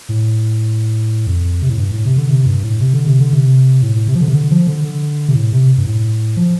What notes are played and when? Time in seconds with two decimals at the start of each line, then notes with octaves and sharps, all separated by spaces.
0.09 A2
1.27 F2
1.62 C3
1.69 A2
1.78 G2
1.91 A2
2.05 C3
2.17 D3
2.29 C3
2.46 G2
2.63 A2
2.80 C3
2.94 D3
3.06 C3
3.20 D3
3.33 C3
3.82 A2
3.95 A2
4.08 C3
4.15 F3
4.21 D3
4.28 C3
4.34 D3
4.51 F3
4.67 D3
4.84 D3
5.29 C3
5.34 A2
5.53 C3
5.77 G2
5.86 A2
6.36 F3